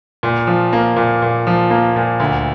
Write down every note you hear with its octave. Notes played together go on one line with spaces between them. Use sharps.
A#2
F3
A#3
A#2
A#2
F3
A#3
A#2
D2